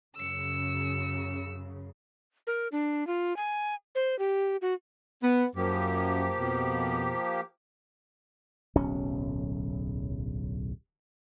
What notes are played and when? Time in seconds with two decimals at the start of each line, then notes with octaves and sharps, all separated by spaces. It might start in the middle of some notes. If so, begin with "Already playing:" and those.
0.16 F#2 C#3 E6 C#7
2.47 A#4
2.72 D4
3.07 F4
3.37 G#5
3.95 C5
4.19 G4
4.62 F#4
5.23 B3
5.56 F#2 F3 A#3 G4
6.39 F2 B2
8.75 D1 B1 C#4